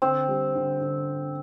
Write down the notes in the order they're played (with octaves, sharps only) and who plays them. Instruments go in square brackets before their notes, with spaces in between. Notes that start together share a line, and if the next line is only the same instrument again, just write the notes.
[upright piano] D3 [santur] C4
[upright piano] G3
D3
D3